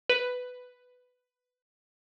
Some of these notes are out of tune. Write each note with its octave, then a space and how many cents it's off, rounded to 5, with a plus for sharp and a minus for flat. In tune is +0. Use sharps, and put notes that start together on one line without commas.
B4 +10